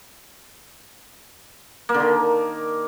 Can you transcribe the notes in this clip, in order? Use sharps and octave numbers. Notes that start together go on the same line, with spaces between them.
A#3
D3
D#3